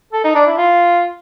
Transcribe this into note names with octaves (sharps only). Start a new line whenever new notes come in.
A4
D#4
D4
E4
F4